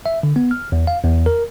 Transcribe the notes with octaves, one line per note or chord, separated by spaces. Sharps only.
E5
D3
B3
F6
E2
F5
E2
A#4